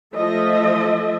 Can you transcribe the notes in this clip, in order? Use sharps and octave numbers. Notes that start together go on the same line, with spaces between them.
F3 A3 A4 D#5 E5